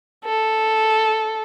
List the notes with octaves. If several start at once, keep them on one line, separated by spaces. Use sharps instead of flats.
A4